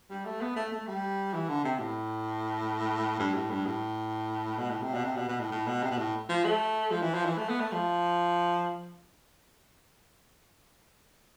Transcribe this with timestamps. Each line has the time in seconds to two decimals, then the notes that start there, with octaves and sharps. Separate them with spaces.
0.10 G3
0.25 A3
0.41 B3
0.56 A3
0.72 A3
0.87 G3
1.34 E3
1.49 D3
1.64 C3
1.80 A2
3.19 G2
3.34 A2
3.50 G2
3.66 A2
4.58 B2
4.70 A2
4.82 C3
4.94 B2
5.04 C3
5.17 B2
5.28 B2
5.40 A2
5.51 A2
5.67 B2
5.83 C3
5.91 B2
5.98 A2
6.29 F3
6.44 A3
6.91 F3
7.02 E3
7.15 F3
7.25 E3
7.38 A3
7.49 B3
7.60 A3
7.72 F3